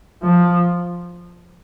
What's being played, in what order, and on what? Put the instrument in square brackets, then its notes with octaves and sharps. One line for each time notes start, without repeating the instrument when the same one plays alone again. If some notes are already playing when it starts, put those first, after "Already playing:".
[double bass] F3